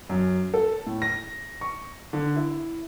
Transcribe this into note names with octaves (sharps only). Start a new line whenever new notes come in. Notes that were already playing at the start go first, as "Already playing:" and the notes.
F#2
A4
A2
A#6
C#6
D3
E4